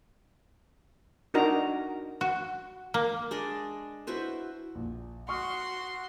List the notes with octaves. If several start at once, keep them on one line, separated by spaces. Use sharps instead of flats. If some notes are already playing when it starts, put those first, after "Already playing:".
D4 D#4 F#4 A#4 A#5
F#4
A#3
G#3 D4 D5 D#5
E4 F#4 B4 C5
A#1
F#4 C6 C#6 D#6 F6